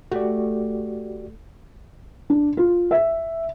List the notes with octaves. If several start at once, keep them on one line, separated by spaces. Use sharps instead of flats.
A3 F#4 G4 D5
D4
F4
E5